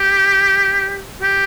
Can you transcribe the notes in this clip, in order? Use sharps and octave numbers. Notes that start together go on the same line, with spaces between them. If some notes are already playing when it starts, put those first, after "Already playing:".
Already playing: G4
G4